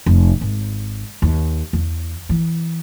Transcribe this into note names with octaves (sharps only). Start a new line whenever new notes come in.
F1
G#1
D#2
E2
E3